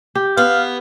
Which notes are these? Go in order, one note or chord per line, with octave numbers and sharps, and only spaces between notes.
G4
B3 F5